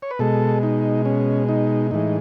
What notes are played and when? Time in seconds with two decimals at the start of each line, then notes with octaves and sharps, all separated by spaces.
0.02 C#5
0.11 B4
0.19 B2 G#3 A4
0.63 D#4
1.05 C#4
1.49 D#4
1.91 A2 E3 G#3 D#4